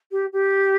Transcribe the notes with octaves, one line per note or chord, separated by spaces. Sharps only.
G4
G4